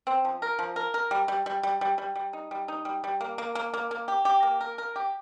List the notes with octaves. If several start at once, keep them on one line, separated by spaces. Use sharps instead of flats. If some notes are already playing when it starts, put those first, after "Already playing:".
C4
F3
A#4
F3
A#4
A#4
G3
G3
G3
G3
G3
G3
G3
D#4
G3
D#4
G3
G3
A#3
A#3
A#3
A#3
A#3
G4
G4
A#3
A#4
A#4
G4